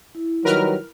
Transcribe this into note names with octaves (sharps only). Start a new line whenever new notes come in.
E4
D#3 F#3 G3 A#4 B4 F6